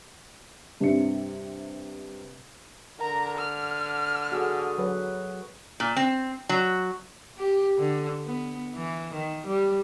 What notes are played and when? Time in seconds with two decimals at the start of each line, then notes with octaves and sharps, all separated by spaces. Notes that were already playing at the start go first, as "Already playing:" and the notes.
0.80 G2 C3 C4 D4 E5 C#7
2.99 D3 A#4 A#5
3.37 F6
4.32 F#4 G#4 A4
4.78 F#3 B4
5.80 A#2
5.97 C4
6.49 F#3
7.37 G4
7.78 D3
8.24 B3
8.75 E3
9.14 D#3
9.47 G3